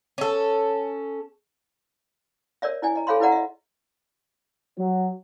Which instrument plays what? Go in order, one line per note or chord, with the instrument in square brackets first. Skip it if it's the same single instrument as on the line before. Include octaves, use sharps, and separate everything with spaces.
[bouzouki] C#4 A4
[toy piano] A#4 C#5 D5 E5
E4 D5 G#5
D#5 A#5
G#4 A4 C#5 F5 B5 C6
E4 B4 D5 F#5 A#5
D#5 E5
[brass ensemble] F#3